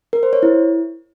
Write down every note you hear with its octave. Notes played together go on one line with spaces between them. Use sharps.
A#4
C5
C#5
E4